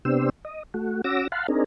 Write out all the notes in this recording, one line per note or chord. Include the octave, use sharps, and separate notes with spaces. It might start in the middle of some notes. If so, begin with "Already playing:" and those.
C3 B3 D4 G4 C5 E6
D#5
A3 F#4
C#4 F#4 D6 E6 A#6
F5 F#5 A5 B5 C6
C4 D4 D#4 G#4 A#4